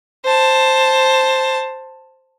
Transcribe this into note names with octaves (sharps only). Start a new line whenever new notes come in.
C5 A5